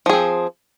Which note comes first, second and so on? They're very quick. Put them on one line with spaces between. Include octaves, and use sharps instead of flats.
F3 G#4 C4